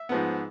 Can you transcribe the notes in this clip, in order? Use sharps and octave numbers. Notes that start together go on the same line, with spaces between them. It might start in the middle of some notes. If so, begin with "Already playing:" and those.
Already playing: E5
G#2 F3 B3